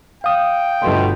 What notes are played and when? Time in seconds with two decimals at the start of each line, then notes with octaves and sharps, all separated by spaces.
0.24 F5 G5 D#6
0.82 G1 B2 A3 C6